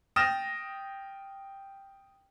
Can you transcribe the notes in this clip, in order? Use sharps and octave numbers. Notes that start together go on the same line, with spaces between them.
G5 D#6 F6 A6 A#6 E7